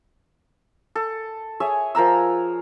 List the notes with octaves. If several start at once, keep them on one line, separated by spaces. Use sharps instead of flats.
A4
G#4 C#5 E5
F3 A#4 A#5 E6